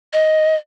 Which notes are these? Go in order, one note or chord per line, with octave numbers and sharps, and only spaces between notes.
D#5